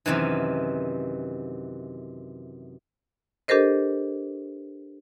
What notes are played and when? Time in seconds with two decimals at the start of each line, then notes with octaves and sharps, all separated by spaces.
0.06 F#2 C3 D#3 E3
3.48 D4 G4 A4 A#4 C5 D#5